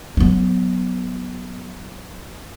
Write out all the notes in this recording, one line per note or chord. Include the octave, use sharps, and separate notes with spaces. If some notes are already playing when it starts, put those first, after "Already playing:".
F#3 B3